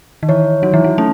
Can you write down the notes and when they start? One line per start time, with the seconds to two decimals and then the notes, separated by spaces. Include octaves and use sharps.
0.23 D#3
0.29 E3 C#5
0.63 F#3 D#4
0.74 E3
0.84 F#3
0.98 A3 C#4